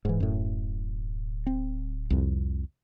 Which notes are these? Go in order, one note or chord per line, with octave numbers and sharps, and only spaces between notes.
D1 G#2 E3
F#2 A2
C4
C2 F2